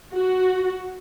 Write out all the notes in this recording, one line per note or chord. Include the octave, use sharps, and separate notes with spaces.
F#4